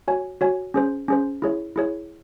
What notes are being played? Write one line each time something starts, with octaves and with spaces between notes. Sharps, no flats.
F#4 C#5 G#5
F#4 C#5 G#5
C#4 G#4 C5
C#4 G#4 C5
E4 G#4 C#5
E4 G#4 C#5